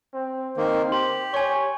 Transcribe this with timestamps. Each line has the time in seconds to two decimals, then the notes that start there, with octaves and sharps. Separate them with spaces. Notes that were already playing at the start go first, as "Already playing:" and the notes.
0.13 C4
0.57 D#3 A#3 C4
0.92 G4 C6
1.34 C#5 G#5 C#6